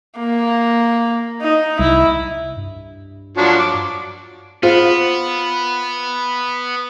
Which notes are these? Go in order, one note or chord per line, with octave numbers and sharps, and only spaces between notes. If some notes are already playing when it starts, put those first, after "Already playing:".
A#3
D#4
C2 E4
G2
F3 F#3 D4
D6
B3 F4 C5